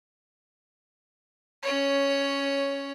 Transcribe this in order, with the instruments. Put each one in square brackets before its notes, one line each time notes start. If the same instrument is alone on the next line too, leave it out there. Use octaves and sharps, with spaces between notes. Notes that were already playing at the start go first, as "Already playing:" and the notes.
[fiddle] C#4 C#5